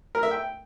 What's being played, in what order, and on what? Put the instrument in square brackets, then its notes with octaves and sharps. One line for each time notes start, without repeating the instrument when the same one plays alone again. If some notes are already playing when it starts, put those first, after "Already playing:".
[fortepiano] A#4
E5
G5